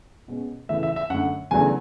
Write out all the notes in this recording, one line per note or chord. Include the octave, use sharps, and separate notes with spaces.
B2 G#3 C#4
C#3 E3 A3 E5
E5
E5
F#2 D3 A3 F#5
E2 C#3 F#3 A3 D4 G#5